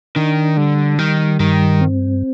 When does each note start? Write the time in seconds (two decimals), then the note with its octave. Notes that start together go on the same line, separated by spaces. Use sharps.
0.16 D#3 D4
0.57 D3 G3
0.99 D#3 G3
1.40 G2 D#3
1.81 C4